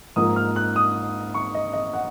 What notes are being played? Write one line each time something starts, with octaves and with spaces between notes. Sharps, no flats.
G#2 F3 A#3 D#4 D#6
F6
F#6
D#6
C#6
D#5
D#5
F#5